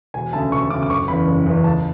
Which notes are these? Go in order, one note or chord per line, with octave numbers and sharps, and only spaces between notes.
E1 G#5
D2 C#3 A5
E1 C#6
D2 C#3 D6
D6
F#1 C#6
E2 C#3 E3 B5
F#1
E2 C#3 E3
C#2 A5